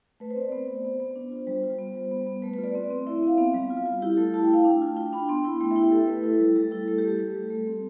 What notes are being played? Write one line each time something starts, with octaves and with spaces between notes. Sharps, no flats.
A3 B4
C5
C4
D5
B3 C5
B3
B3
B3
D4
F4
G3 C5
F4
B3
G3
B3
B3
A3 B4
B4
F4
D5
C4 D5
C4
E4 E5
C4 F5
B3 F5
G3
F4
F4
E4 G4
A3 A4
E4 A5
G5
E4 F5
D4 G5
F4
F4 G5
D4 B5
B3 C6
E4 C6
A3 G5
E5
E4
G4
A3 A4
A3 B4
E4 A4
G3
G3 A4
E4 A4
A3 A4
G4
A3 A4
G3 A4
G3
A3
C4